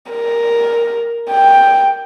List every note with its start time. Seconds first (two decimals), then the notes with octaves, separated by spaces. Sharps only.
0.11 A#4
1.31 G5